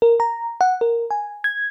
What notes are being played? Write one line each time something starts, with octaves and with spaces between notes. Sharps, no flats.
A#4
A#5
F#5
A#4
G#5
G#6